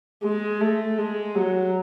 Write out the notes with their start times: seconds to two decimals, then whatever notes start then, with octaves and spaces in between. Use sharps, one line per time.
0.24 G#3
0.61 A3
0.98 G#3
1.35 F#3